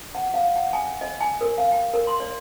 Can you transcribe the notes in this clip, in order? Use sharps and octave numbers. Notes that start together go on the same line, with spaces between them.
F#5
F5
F#5
G#5
D#5
G#5
A#4
F5
G5
A#4
C6
D5